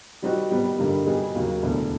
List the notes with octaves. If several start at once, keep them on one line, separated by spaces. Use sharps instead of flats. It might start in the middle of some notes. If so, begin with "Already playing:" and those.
D#3 G3 C4 D#4 F#4
D#3 G3 B3 D#4
G2 D3 G3 A#3 D#4
B2 G3 B3 D#4 G#4
D#2 C#3 F#3 A#3
E1 D2 D3